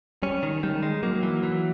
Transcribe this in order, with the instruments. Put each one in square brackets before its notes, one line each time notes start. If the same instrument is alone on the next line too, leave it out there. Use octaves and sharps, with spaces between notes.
[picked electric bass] G3 [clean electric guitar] C#4
[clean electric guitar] D#3
[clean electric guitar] D#3 [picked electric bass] G3
[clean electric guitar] G#3
[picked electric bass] F#3 [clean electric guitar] A#3
[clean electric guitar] E3
E3